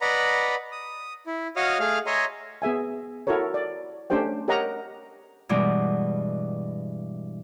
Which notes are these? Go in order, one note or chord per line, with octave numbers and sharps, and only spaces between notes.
B4 D5 D#5 F#5 A#5 B5
D#6
E4
F#4 C#5 D#5 F5 D#6 F6
A3 G#4 F5 F6
C#5 D#5 E5 G#5 A#5 C6
B3 G#4 E5 G#5
E4 F#4 A4 A#4 C#5
D5
A3 C#4 D4 G4 C5 G5
G4 A#4 C#5 D#5 F#5 A#5
G2 B2 E3 G#3 D5